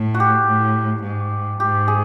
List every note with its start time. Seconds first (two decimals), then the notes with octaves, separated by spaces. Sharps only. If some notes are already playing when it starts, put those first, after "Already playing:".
Already playing: A2
0.15 F#4
0.20 G4
0.47 A2
1.03 G#2
1.60 G#2 G4
1.88 G#4